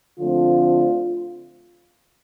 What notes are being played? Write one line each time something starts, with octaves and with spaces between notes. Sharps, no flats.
D3 F3 A3 C4 F4